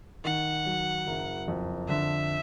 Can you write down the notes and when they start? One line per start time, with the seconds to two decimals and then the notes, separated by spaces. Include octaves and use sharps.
0.24 D#3 F#5
0.66 F#3
1.07 F#1
1.48 F2
1.89 D3 E5